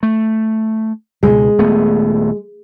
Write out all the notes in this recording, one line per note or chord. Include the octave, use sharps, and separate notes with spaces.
A3
C#2 B2 G#3
D#1 A3 B3